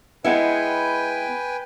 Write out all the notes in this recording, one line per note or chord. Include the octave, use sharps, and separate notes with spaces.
G#3 B3 E4 B4 G5 G#5